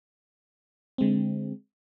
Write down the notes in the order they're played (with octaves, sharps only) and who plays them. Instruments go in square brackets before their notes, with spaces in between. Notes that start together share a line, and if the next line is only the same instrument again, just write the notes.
[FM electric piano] D3 G#3 C4